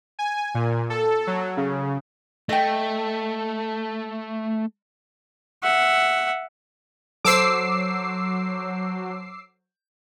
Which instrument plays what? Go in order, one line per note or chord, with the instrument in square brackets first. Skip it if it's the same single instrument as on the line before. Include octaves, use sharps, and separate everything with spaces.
[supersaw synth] G#5
A#2
A4
F#3
C#3
[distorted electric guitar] A3 [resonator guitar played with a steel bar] D#5 G5
[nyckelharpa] E5 F#5
[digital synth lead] F#3 [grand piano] A4 C5 [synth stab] D6 E6 C7